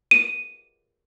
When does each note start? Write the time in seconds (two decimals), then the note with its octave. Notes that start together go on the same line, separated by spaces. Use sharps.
0.11 D#7